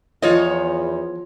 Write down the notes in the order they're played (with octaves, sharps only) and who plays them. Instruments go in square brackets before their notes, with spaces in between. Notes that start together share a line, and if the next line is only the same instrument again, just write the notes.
[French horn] E2 [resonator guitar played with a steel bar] F3 C#5 D#5 [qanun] F4 C5